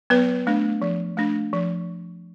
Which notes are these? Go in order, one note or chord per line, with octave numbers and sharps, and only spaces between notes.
F#3 B3 B4
A3 D4
F3
A3 D4
F3